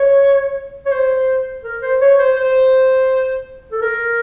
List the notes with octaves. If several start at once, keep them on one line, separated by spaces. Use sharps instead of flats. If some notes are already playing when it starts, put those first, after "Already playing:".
Already playing: C#5
C#5
C5
A#4
C5
C#5
C5
C5
A4
A#4